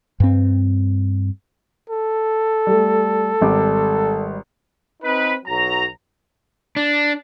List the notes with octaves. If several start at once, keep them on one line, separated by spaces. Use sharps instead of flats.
G2 C4
A4
G3 A3
G#1 G3 D6
C4 D#4 B4
B1 F#3 A#5
D4